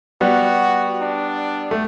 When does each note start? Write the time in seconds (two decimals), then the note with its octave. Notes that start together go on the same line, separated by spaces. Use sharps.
0.21 G3 B3 F#4
1.01 D4
1.71 A3